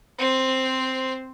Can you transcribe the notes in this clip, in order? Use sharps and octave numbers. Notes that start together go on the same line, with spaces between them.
C4 C5